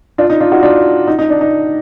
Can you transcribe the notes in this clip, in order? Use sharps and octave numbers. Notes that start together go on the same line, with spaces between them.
D4 F4
D#4
D4 F4
D#4 F#4
D4 F4
D#4
D#4
D4
D#4